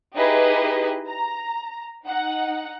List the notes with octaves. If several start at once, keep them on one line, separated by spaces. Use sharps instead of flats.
D#4 E4 G4 G#4 B4 D#5
A#5
D#4 F#5